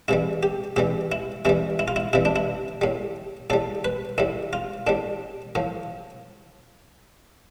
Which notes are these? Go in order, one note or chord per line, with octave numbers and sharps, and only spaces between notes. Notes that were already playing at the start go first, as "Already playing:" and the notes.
C3 E3 G3 E4
G4
C3 E3 G3 G4
E4
C3 E3 G3 E4
E4
F4
E4
C3 E3 G3 E4
D4
E4
A2 G3
A2 G3 A4
B4
A2 G3 E4
F4
A2 G3 D4
A2 F3